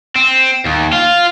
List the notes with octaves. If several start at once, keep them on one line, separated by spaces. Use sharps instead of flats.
C4
D#2
F4